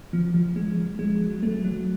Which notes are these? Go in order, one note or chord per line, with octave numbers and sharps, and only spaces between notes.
F3
F3
G#3
F3
G#3
F#3
A3
F#3